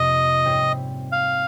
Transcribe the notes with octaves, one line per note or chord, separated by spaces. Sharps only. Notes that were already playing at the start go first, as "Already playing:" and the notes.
Already playing: F2 C3 A#3 D#5
G#2 G3 C4 G4 C#5
F5